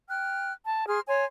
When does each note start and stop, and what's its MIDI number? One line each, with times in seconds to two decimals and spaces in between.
0.08 0.52 79
0.08 0.52 89
0.08 0.52 90
0.67 0.87 81
0.88 1.00 68
0.88 1.00 84
0.88 1.00 89
1.08 1.25 73
1.08 1.25 80
1.08 1.25 84